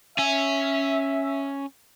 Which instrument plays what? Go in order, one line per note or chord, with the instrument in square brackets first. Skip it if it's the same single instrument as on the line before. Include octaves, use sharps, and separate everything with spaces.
[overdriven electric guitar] C#4 G#5 [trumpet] E5